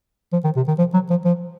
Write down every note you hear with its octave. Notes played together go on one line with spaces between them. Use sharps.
F3
D#3
C3
D#3
F3
F#3
F3
F3